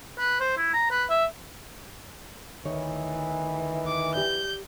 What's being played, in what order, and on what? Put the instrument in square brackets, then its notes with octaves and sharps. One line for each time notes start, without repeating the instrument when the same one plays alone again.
[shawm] B4
C5
E4
A#5
B4
E5
[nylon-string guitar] D2 C#5 [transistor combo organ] D#3 [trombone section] E3
[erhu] D6
[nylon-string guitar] G4 D5 [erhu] G6